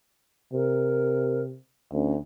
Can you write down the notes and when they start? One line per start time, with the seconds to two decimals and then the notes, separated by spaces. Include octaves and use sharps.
0.53 C3 A#4
1.93 D2 C#4